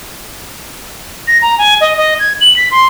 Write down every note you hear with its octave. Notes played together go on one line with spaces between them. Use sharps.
A#6
A#5
G#5
D#5
D#5
G#6
F#7
B6
C6